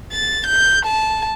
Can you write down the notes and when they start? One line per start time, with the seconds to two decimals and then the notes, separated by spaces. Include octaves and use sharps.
0.12 A6
0.47 G6
0.86 A5